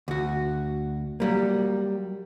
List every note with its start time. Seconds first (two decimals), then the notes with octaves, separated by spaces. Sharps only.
0.08 D2 F#4
1.20 F#3 G3 A#3